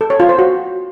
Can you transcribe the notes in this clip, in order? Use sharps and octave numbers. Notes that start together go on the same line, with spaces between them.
A4
C#5
F4
C5
F#4